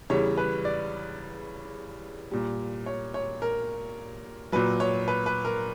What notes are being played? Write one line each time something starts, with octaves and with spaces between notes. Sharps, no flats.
E2 C#3 G3 C#5
B4
D5
A#2 G3
C#5
C#5
A#4
A#2 F#3 B4
C#5
B4
B4
A#4